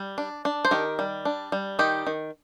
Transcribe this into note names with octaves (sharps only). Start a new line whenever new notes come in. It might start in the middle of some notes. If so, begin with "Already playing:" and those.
Already playing: G3
D4
D4
C5
D#3 G4 A#4
G3
D4
G3
D#3 D#4 G4
D#3